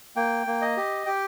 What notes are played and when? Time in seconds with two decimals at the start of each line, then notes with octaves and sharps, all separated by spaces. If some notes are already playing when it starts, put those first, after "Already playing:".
0.16 A#3 G5
0.47 A#3
0.62 D#5
0.77 G4
1.06 G4 G5